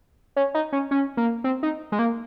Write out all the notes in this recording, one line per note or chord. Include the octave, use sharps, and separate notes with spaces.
C#4
D#4
C#4
C#4
A#3
C4
D#4
G#3
A#3